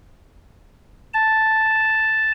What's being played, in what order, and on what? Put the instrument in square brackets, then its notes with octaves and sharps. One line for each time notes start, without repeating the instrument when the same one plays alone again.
[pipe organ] A5